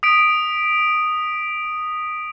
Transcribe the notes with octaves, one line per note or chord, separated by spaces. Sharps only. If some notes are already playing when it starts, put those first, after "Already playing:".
D#6 B6 D7